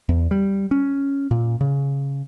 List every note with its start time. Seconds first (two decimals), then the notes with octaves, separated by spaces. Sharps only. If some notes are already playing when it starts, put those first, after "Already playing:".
0.09 E2
0.31 G3
0.71 C#4
1.31 A#2
1.61 C#3